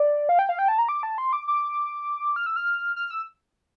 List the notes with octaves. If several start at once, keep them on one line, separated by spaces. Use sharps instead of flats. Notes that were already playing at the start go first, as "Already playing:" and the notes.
Already playing: D5
F5
G5
F5
G5
A5
A#5
D6
A5
C6
D6
D6
F6
E6
F6
F6
E6